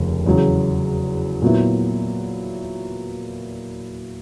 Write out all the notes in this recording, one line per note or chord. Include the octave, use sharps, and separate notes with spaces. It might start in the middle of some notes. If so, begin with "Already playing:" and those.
Already playing: F1 D#2 C#3
E2 C#3 F#3
A#2 F#3 B3 E4